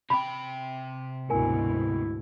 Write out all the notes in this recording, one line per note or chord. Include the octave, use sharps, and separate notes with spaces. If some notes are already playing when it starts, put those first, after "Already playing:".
C3 G5 B5 D6
D2 G#2 B2 E4 A#4 G#5